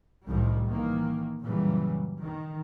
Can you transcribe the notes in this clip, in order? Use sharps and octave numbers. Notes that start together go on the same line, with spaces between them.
C2 A2 D#3 F3 G3
D#3 E3 A#3
F#2 A#2 C#3 E3 F#3 G3
D#3